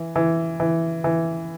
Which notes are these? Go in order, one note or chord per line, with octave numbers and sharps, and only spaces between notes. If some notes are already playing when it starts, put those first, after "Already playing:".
Already playing: E3
E3
E3
E3